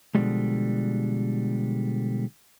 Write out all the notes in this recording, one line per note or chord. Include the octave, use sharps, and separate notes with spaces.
B2 D3 D#3 F3 G3 G#3